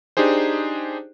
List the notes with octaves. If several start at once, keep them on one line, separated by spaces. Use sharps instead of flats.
D4 D#4 G4 G#4 C5